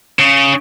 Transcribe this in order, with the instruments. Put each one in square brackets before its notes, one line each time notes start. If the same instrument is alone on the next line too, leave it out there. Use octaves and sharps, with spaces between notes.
[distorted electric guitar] C#3